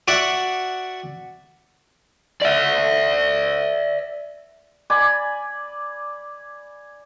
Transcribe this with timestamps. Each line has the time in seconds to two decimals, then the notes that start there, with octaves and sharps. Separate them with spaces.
0.08 F#4 D5 E5 F#5
2.42 D5 E5
4.90 D5 G#5 B5